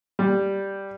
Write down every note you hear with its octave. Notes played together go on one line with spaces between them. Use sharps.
G3